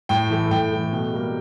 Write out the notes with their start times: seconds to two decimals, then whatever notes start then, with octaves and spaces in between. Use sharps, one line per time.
0.09 A2 G5
0.30 E3 A3
0.51 A2 G5
0.71 E3 A3
0.93 B2
1.13 G3 A#3